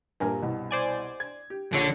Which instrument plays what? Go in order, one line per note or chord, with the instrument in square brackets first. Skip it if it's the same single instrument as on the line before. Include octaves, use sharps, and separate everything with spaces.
[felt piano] A#1 A#4 G#5 [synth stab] G2
[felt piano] C2 B2
[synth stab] C5 D5 G#5
[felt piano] G#6
G4
[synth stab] A#1 C#5 [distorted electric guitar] D3